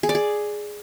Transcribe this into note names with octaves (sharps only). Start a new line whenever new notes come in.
G#4
D5
G#4